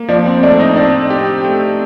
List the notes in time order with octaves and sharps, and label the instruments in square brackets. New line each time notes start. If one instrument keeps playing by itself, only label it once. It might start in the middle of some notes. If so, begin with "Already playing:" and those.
Already playing: [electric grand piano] A#3
[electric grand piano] F3 [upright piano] D4
[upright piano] C4
[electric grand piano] A3 [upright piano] D4
[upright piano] D#4
[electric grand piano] C4 [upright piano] D4
[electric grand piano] G4
A3